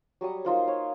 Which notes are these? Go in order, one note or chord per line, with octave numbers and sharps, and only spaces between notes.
F#3 G3 C#6 D#6
A#3 D#4 F4 C5
C#5